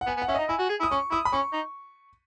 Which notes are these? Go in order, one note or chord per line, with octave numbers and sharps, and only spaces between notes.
F#5
B3 G#5
B3
F#5
C#4 E5
D#4 D#5
E4 G#5
F#4
G#4
E4
D#6
C#4 C#6
E4 D#6
B5
C#4 C#6
D#4